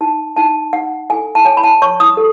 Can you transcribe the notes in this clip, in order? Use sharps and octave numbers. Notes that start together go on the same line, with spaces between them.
D#4 A5
D#4 A5
D#4 F#5
A4 G#5
A5
C#5 G#5
B5
A5
C#5 C#6
D#6
A4